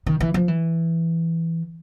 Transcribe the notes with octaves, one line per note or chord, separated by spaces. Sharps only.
D#3
E3
F3
E3